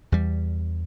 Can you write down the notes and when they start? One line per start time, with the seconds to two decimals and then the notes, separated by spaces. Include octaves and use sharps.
0.12 E2 G3